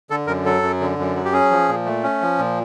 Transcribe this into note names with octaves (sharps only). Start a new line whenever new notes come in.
D3 A4
F#2 A#4
F#3 A4
F#2
D3
F#2
F#3
G4
C#4 G#4
F3
A#2
A3
C#4
F3
A#2